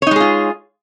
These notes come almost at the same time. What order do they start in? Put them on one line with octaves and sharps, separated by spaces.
C#5 D#4 G#3 G#4 F4